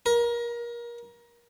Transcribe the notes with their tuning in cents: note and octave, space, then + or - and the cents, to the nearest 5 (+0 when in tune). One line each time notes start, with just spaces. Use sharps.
A#4 +25